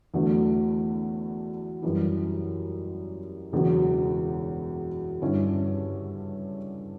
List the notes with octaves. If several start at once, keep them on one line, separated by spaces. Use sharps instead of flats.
E2 D3 F#3 A3
F#2 E3 G3
E1 E2 C#3 F#3
G2 D3 G3 C#4 E4